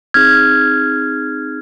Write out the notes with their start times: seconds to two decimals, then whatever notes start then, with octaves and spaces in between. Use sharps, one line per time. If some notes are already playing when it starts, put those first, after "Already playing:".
0.14 C4 D#4 G#4 F6 G#6